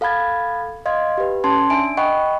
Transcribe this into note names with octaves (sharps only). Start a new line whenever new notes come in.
A4 F5 F#5 B5 G#6 A6
D#5 F5 C6 G#6
G4 B4
C#4 A5 C6 G#6
D4 E5 G#5 D7
D#5 F#5 G5 B5 C#6